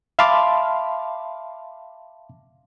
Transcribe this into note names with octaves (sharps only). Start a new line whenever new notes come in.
E5 F5 A5 B5 C6 D6